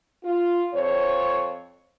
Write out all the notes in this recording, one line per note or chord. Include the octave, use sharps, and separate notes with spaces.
F4
F2 C5 C#5